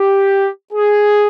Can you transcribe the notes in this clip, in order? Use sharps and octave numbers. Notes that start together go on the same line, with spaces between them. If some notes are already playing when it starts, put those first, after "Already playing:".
Already playing: G4
G#4